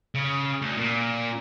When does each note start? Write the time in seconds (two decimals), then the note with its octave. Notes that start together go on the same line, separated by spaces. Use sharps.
0.15 C#3
0.61 D2
0.77 A#2